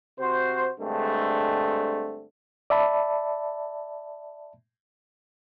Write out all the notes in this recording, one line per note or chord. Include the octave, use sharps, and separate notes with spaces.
C3 F#4 C5
G2 D3 G#3 A3 C4
D5 E5 A5 B5